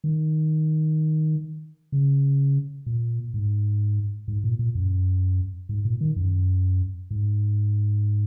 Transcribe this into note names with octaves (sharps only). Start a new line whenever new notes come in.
D#3
C#3
A#2
G#2
G#2
A#2
A#2
F#2
G#2
A#2
D#3
F#2
G#2